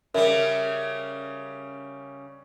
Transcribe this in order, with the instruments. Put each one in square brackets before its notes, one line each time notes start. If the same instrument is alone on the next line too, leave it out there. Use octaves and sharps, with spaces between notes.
[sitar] C#3 G3 [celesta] A#4 E5